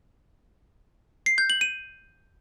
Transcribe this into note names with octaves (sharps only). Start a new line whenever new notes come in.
C7
G6
F#7
D#7